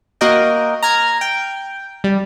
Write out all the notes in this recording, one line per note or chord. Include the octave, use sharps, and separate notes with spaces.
A#3 F#4 A#4 D#5 G5
A#5 F6 G#6
G5
G3